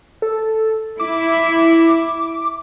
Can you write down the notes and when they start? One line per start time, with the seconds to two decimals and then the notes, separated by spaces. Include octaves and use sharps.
0.22 A4
1.00 E4 D6